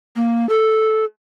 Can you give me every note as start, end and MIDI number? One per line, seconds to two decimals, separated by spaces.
0.16 0.48 58
0.49 1.05 69